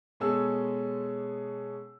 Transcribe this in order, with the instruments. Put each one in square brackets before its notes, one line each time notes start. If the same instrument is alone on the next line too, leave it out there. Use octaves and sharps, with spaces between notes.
[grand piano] B2 G#3 C#4 G#4 A4 E6